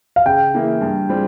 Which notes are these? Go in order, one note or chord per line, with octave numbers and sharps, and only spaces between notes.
F5
C#3 G5
E3 A#3 E4 G#4
G2
G3 C4 F4 G#4